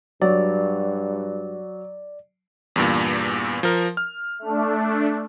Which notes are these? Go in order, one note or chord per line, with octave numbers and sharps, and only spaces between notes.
G2 F#3 D5
E2 G2 A#2
F3 A#4
F6
A3 D4